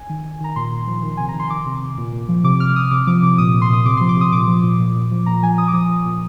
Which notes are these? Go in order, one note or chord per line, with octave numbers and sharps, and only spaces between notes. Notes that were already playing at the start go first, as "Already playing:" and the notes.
Already playing: G#5
D#3
D#3
D#3 A#5
A#2 C6
A#2
F3
D#3
C3 G#5
A#5
D#3
C6
D#3 D6
C3
C3
A#2
A#2
F3
C3 D6
C3 F6
C3 D#6
C3 D6
F3 D6
C3 D6
A#2 D#6
A#2
C6
A#2 D#6
C3 D6
F3 C6
D6
C3 D#6
A#2 D6
F3
A#2
A#2
A#2
F3
A#2 A#5
F3 G#5
F3 D#6
D6
F3 D#6
F3
A#2